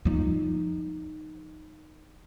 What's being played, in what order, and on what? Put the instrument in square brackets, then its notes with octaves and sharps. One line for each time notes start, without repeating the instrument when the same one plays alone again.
[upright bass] F3 D#4